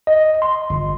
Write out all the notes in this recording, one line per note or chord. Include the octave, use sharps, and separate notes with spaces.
D#5
C6
G1